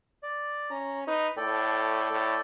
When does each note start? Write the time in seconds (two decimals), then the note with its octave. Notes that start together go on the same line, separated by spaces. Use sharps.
0.23 D5
0.71 C#4 A#5
1.07 D#4 B4
1.37 A2 A4 D5 G5
2.11 A2